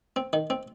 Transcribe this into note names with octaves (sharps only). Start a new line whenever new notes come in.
C4
D#3
C4